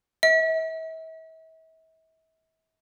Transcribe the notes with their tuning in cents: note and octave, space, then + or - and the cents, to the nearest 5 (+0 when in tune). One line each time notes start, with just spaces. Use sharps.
E5 -40